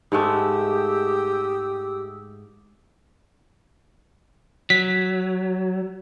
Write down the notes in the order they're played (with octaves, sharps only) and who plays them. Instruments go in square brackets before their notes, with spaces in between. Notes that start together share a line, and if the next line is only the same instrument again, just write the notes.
[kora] G#2 G#3 A3 [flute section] G4 D#6 E6
[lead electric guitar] F#3 [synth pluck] B6